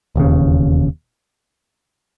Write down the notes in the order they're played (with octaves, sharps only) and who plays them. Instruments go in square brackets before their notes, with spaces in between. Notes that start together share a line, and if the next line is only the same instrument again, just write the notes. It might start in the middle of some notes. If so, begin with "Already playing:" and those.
[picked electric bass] E1 D#2 C#3